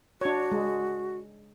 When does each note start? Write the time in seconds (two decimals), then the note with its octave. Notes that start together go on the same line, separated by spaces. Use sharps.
0.21 D4 F#4 C#5
0.52 G#3